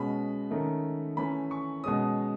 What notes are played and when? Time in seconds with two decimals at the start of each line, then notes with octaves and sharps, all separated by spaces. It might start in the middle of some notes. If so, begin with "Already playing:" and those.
Already playing: B2 G#3 C#4 B5
0.51 D#3 A3 C#4
1.17 E3 A3 C#4 B5
1.51 C#6
1.84 B2 G#3 C#4 D#6